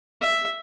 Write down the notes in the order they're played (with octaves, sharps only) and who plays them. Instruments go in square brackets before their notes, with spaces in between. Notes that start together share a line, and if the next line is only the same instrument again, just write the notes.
[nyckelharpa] E5